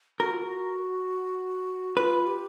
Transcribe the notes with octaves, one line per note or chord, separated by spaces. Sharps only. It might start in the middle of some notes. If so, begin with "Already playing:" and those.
F#4 A#4
F4
F#4
F4 B4
G4